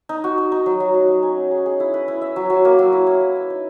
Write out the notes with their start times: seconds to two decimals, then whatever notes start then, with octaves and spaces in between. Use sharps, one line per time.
0.09 D#4
0.24 F#4
0.38 D#4
0.52 D#4
0.66 F#3
0.80 F#3
0.94 F#3
1.08 F#3
1.23 C#4
1.37 C#4
1.51 G#4
1.66 G#4
1.80 E4
1.94 B4
2.08 E4
2.21 E5
2.36 F#3
2.50 F#3
2.65 A#3
2.79 F#3
2.93 E4
3.07 E4
3.21 B4
3.36 E5
3.50 D#4